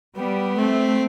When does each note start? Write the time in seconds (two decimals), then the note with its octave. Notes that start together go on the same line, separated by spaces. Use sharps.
0.17 G3 B3
0.59 A3 C4